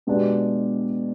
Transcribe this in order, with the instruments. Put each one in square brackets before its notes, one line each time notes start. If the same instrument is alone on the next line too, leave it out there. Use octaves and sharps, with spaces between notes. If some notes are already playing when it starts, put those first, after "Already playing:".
[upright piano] B2 G#3 B3 D4 G4